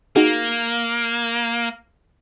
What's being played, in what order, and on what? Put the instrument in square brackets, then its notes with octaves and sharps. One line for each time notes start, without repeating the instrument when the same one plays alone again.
[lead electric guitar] A#3 [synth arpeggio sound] D#4 F#4 G#4